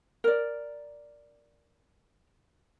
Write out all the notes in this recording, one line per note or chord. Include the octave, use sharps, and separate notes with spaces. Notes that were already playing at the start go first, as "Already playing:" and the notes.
A#4 D5